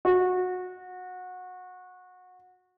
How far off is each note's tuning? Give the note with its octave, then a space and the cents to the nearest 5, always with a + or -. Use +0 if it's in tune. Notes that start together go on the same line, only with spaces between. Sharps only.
F#4 -20